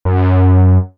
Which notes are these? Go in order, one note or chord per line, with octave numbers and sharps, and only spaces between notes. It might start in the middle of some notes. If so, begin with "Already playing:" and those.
F#2